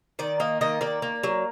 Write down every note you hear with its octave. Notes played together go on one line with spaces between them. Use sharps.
D#3 D5
A#3 D#5
D#3 D#5
A#3 D5
A#3
F#3